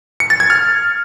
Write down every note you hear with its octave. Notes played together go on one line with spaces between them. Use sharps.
C#7
A6
G#6
F6